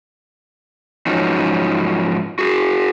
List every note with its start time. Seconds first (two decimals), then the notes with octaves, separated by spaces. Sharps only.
1.06 G#2 F3 F#3 C#4 D#4
2.39 F#4 G#4